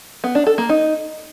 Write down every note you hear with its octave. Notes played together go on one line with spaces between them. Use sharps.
B3
D4
A4
A#3
D#4